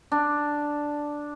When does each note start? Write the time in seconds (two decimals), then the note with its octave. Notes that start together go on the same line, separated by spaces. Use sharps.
0.12 D4